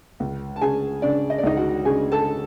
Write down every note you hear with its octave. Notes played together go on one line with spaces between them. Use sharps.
C#2
A5
C#3 G#4 G#5
C#3 D4 D5
D#5
D5
C#2 D#4 D#5
F#4 F#5
C#3 G#4 G#5
A4 A5